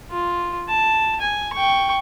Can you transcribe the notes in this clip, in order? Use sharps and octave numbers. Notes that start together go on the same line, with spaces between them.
F4
A5
G#5
G5 C#6